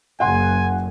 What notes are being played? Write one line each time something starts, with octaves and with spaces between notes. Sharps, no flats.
F#1 F#5 G#5 C6